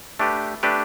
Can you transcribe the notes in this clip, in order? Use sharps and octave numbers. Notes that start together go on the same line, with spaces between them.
A3 D4 G4 B4
A3 D4 G4 B4